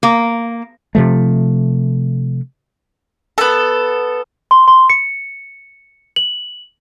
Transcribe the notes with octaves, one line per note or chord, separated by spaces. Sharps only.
A#3
C3 F3 A3
B3 A4
C6
C6
C#7
F#7